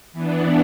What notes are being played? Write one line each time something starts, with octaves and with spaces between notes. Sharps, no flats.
E3 B3 D4